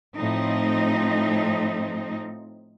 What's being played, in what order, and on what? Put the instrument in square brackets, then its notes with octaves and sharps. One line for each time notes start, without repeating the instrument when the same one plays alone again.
[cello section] A2 F3 C4 D#4